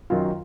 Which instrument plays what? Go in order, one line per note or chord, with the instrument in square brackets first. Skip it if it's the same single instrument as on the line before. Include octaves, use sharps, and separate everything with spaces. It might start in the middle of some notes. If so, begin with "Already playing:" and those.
[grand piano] F#2 D#3 F#3 [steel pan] F4